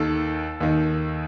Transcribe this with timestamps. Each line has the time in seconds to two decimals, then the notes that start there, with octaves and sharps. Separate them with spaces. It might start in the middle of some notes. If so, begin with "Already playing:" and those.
Already playing: D#2 D#3 A4
0.60 D#2 D#3